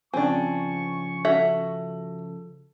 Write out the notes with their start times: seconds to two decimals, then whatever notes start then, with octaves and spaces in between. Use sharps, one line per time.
0.14 C#3 F3 C4 D4 G#5 C#6
1.25 C#4 F#4 A4 E5